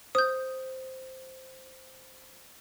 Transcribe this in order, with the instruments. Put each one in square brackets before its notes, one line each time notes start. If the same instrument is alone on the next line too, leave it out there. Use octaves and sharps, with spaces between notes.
[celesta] C5 [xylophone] D#6 G6